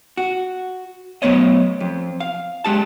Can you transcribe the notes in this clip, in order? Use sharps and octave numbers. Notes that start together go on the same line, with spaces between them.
F#4
F#3 A3 B3 C#5 D#5
F2
F5
G#3 G4 A5